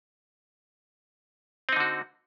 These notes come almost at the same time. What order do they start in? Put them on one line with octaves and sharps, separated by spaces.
C4 D#4 D3 F#4